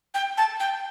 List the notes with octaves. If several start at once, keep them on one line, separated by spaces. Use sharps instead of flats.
G5
A5
G5